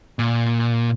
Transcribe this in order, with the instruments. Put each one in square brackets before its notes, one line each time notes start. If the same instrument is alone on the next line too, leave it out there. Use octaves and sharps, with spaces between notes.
[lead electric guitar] A#2